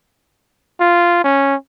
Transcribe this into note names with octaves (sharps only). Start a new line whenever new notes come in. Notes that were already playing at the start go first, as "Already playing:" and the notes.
F4
C#4